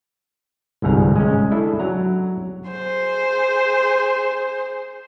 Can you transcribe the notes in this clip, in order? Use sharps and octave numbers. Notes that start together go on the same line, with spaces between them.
G1 C2 G#2 A#5
G#3 C#4
D4 E4 A4 E5
F#3 A#5
G#4 C5